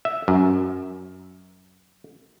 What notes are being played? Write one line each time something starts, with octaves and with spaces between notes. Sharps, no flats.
E5
F#2